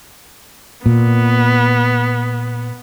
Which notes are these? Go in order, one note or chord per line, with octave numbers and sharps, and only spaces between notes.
A#2 B3